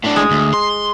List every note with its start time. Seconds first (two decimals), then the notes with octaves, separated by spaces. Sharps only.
0.04 A2 D4
0.16 G#3
0.31 D2
0.54 C6